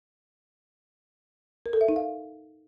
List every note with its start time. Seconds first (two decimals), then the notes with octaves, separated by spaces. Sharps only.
1.66 A#4
1.73 A4
1.81 E5
1.89 D#4
1.96 F5